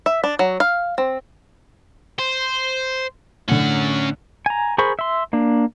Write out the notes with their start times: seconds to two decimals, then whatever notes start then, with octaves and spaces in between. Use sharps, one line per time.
0.06 E5
0.24 D4
0.39 F#3
0.60 F5
0.98 C4
2.19 C5
3.48 A2 D3 C#4 F#5
4.46 G#5 A#5
4.78 G#4 A#4 C5 B5 C#6
4.99 E5 C6
5.33 A#3 D4